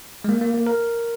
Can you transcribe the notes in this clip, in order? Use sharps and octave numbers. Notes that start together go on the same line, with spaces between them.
G#3
A#3
A#3
A#3
A#4